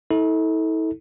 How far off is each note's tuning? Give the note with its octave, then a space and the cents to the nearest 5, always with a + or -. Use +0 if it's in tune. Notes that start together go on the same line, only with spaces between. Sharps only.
E4 -45 A4 +0